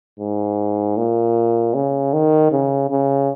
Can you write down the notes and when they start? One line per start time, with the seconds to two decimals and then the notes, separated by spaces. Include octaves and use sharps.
0.19 G#2
0.97 A#2
1.74 C#3
2.13 D#3
2.52 C#3
2.90 C#3